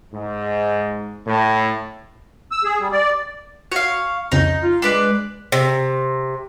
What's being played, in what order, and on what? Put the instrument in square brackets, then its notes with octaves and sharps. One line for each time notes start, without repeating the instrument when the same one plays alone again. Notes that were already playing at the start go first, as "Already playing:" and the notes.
[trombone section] G#2
A2
[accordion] E6
G#4
G3
D5
[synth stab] F#4 [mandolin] C#5 F5
[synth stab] C2 F2 C#3 [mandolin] D#4
[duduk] F4
[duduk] G#3 [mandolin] D4 B4 D5
[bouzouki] C3